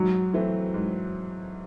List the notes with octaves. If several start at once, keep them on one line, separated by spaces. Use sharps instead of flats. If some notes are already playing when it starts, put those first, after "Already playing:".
Already playing: G#2 F#3
E3 A3 C4
G#2